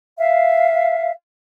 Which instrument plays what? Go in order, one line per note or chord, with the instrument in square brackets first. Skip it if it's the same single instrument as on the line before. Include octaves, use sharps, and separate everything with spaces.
[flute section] E5 F5